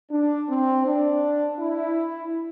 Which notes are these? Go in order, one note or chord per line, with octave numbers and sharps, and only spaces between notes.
D4
C4
D4
E4